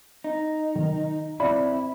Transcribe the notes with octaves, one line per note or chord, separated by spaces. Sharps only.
D#4
D#3
C4 E4 D5 B5